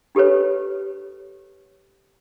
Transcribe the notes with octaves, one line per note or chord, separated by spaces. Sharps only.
D4 G4 A4 B4 C#5